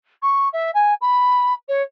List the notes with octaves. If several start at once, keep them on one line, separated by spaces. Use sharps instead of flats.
C#6
E5
G#5
B5
C#5